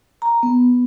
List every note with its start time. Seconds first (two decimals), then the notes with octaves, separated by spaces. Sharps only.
0.22 A#5
0.43 B3